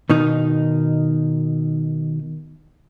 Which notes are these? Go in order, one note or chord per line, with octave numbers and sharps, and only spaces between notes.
B2 D#3 D#4